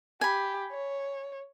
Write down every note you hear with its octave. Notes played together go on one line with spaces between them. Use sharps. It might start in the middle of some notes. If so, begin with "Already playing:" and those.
G4 G#5 B5
C#5